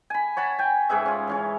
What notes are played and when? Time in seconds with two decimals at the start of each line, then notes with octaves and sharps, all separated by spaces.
0.10 G#5 B5
0.37 C#5 F#5 A5 B5
0.59 G5 G#5
0.89 G#2 G#4 B4 E5
1.05 C#4 F4
1.28 E3 C#4 C#5